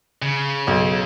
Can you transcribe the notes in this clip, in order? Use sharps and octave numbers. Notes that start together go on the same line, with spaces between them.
C#3
B1